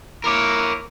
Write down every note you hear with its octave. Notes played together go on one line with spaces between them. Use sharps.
A#3 E4 A#4 C#5 D6